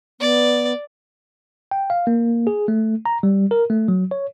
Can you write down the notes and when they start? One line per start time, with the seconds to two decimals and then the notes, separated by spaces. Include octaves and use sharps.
0.20 B3 D5
1.71 G5
1.90 F5
2.07 A#3
2.47 G#4
2.68 A3
3.06 A#5
3.23 G3
3.51 A#4
3.70 A3
3.88 F#3
4.11 C#5